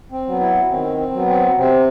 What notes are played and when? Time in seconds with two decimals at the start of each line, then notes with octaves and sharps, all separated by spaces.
0.12 C4
0.26 F#3 B3
0.40 E4
0.69 D#3 C4
0.98 C4
1.12 F#3 B3
1.27 C4
1.55 C3 C4